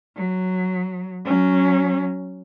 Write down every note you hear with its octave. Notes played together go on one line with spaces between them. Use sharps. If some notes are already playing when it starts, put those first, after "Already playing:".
F#3
F#3 C#4